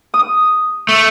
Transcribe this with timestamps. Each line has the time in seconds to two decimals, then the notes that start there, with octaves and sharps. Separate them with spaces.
0.14 D#6
0.89 A3